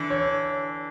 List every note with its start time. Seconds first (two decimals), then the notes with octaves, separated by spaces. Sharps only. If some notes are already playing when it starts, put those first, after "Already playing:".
Already playing: D3 E3
0.10 C#5